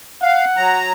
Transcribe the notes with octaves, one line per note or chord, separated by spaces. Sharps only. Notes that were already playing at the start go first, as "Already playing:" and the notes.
F5 F#5
F#3 A#5